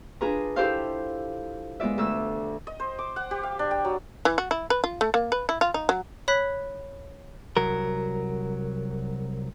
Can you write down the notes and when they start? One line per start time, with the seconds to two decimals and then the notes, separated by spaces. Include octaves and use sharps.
0.21 D4 F4 G#4 B4 A#5
0.56 E4 F4 G4 A4 C5 F5
1.80 G#3 B3 F4 D5 E5
1.98 D2 A4 E6
2.67 D#5
2.80 C5
2.99 D6
3.16 F#5
3.31 G4
3.43 F5
3.59 D4
3.71 G5
3.85 F#3
4.25 E3
4.38 F#4
4.51 E4
4.70 B4
4.84 F4
5.01 A3
5.14 A#3
5.32 B4
5.49 E4
5.61 F4
5.74 D#4
5.89 F#3
6.28 C#5 B5 F#6 B6
7.57 C2 F#3 A#4